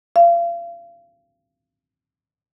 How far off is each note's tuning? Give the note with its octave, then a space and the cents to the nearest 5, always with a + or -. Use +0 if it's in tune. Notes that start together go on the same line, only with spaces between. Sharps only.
F5 -35